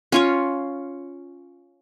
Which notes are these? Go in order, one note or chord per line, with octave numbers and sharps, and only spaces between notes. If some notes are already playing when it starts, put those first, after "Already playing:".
C#4 F4 C#5